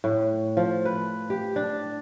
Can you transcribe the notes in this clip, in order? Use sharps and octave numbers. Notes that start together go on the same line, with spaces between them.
A2
F3
B4
G4
D4